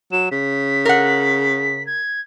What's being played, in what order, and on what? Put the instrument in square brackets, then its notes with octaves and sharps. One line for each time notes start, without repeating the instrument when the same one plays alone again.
[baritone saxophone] F#3 [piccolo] E7
[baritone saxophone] C#3 [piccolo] B6
[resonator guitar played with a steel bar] A#4 F#5
[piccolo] G#6